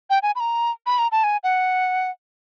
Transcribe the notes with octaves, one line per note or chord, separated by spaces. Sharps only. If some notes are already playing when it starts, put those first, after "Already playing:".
G5
G#5
B5
A#5
B5
A#5
A5
G#5
F#5